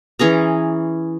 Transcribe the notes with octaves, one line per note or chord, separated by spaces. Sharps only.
E3 C#4 G#4 A#5